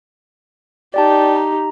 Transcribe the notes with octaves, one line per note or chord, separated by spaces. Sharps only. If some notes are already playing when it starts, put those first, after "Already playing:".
D#4 G4 D5 G5 A5
A#5